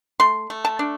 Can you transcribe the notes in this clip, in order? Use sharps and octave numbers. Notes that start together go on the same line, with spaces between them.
A3 C6
A3
A5
D4